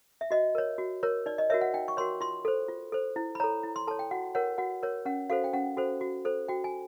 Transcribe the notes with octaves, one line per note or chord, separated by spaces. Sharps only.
E5
F#4 D#5
A#4 C#5
F#4
A#4 C#5
D#4 D5
D#5
F#4 A#4 C#5 E5
F#5
D#4 G5
C#6
F#4 A#4 C#5 C6
F4 C6
A4 C5
F4
A4 C5
E4
B5
A4 C#5 A#5
E4
C6
A4 C#5 A5
G5
F#4 F#5
A#4 C#5 F#5
F#4 F#5
A#4 C#5
C#4 F#5
F#4 A4 C5 F5
G5
C#4 F#5
F#4 A4 C5
F#4
A4 C5
F#4 G5
G#5